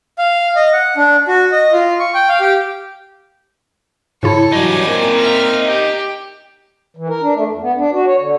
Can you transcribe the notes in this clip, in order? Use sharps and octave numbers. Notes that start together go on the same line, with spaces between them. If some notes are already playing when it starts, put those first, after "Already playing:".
F5
D#5
F#5
D4
F#4
D#5
F4
C#6
G5
F5
G4
G#2 C#3 E4 A4 C#5
G2 E3 F#3 D#4 D5 G#5
A#3 C4 A#4
E5 F6
G4
E3
A#4
D4
A3
F2
B3
D4
F#4
C#5
D3